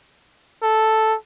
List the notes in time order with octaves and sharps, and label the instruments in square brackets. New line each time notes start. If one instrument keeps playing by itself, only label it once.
[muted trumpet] A4